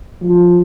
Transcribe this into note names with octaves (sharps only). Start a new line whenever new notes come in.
F3